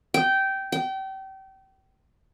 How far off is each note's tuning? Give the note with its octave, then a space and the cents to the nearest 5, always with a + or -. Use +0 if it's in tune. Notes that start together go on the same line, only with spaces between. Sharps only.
G5 -15
G5 -30